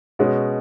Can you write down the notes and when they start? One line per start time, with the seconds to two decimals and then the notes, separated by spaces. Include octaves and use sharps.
0.19 B2 G#3 C#4